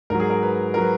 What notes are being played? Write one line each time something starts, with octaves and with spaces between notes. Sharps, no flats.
G#2 F#3 A#4
G#4
A#4
B4
A#4
F#3 B4